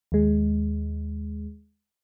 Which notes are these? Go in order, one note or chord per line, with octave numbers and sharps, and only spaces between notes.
D#2 G#3